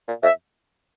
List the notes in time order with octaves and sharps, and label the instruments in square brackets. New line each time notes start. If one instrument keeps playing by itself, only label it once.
[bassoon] A#2
[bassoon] F2 [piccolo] E5